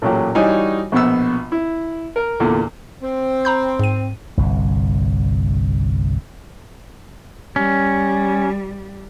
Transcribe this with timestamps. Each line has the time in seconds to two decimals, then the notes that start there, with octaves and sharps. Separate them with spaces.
0.02 A1 A#2 F#3 G4
0.35 E3 G3 D#4 F#4 C#5 G#5
0.92 A#1 B2 B3 E6
1.52 E4
2.16 A#4
2.40 E2 A#2 D3
3.02 C4
3.45 A#5 B5 G6
3.79 G#2 D#7
4.37 G1 C2
7.56 G3 C#4